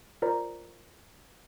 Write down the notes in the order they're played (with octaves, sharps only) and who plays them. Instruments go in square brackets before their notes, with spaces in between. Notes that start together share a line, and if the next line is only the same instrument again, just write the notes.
[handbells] F4 A#4 C5 D5 A#5